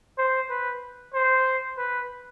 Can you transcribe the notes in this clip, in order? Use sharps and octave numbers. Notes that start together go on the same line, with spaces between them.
C5
B4
C5
B4